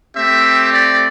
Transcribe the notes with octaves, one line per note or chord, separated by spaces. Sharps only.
A3 C4 G4 E5
D5